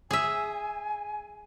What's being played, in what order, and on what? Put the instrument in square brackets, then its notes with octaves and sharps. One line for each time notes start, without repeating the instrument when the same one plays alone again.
[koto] G#4 E5 [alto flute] G#5